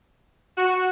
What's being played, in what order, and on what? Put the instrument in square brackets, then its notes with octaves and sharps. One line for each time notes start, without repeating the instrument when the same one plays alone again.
[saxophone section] F#4